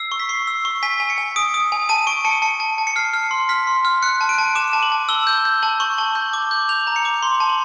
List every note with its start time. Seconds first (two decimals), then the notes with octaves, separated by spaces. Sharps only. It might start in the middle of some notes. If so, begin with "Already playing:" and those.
Already playing: E6 C7
0.12 C#6
0.20 B6
0.29 C#6 C7
0.47 E6
0.65 C#6
0.83 G#5 B6
1.00 G#5
1.10 C#7
1.18 G#5
1.36 D#6 D7
1.54 D#6
1.72 G#5
1.89 A5 D#7
2.07 C#6 D7
2.25 A5 C#7
2.42 A5 C#7
2.60 A5
2.78 A5
2.87 C#7
2.96 F6 C7
3.14 F6
3.31 C6
3.49 F6 B6
3.67 C6
3.85 F6
4.03 F#6 C#7
4.21 A5
4.29 D7
4.38 A5
4.55 D6 E7
4.73 A5
4.83 F#7
4.92 A5
5.09 E6 G7
5.27 G6
5.45 G6
5.62 A5 F#7
5.80 C#6 F#7
5.98 A5 G7
6.15 G6 F#7
6.33 D6
6.43 F#7
6.51 G6
6.69 G6 F7
6.87 A#5
6.96 C#7
7.05 D6
7.23 C6 G7
7.40 A5
7.49 F#7